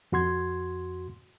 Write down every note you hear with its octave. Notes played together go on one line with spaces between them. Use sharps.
F2 F#4 C6 G#6